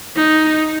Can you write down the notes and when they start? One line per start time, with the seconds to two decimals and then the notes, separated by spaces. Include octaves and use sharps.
0.16 D#4